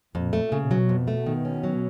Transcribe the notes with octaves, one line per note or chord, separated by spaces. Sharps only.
F2 A#2
A3
C#3
B2 F#3
F2
A3
D#3
C#4
F#3